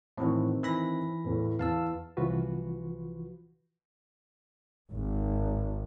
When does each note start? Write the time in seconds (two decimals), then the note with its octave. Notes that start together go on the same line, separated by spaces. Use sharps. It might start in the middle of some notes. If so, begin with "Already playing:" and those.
0.17 A2 D#3 E3 C4 F#4
0.63 E3 B5 A#6
1.24 E2 A2
1.59 E2 F5 A5 E6
2.17 C2 E3 F3 F4 F#4 B4
4.91 G#1